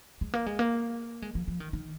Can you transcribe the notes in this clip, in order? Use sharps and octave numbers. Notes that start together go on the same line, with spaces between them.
G#3
A#3
G#3
A#3
G#3
F3
F3
D#3
D#3